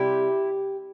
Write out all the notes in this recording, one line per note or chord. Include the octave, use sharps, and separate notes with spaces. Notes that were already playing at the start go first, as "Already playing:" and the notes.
Already playing: C3 G3 E4 G4